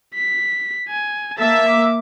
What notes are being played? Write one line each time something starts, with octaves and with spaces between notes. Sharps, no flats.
B6
G#5
A#3 E5 A5
D6